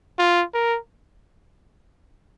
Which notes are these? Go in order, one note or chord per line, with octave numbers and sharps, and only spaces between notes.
F4
A#4